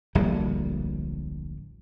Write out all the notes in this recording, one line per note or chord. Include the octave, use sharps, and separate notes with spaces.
D1 A#1 G3